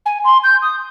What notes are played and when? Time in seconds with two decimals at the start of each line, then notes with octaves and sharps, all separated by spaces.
0.06 G#5
0.24 C6
0.44 G6
0.62 D#6